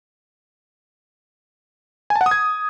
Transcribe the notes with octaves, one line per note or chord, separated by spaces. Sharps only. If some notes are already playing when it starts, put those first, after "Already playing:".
G#5
A5
F#5
D#6
G#6